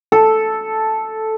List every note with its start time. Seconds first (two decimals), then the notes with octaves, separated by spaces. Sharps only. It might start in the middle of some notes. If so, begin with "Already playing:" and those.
0.12 A4